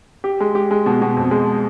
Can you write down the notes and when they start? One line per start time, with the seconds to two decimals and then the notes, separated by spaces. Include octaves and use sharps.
0.24 G4
0.40 G#3
0.55 G4
0.71 G#3
0.86 B2
1.02 B2
1.17 F2
1.31 G#3